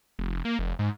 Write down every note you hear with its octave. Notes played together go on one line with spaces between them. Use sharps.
F1
A#3
F1
G#2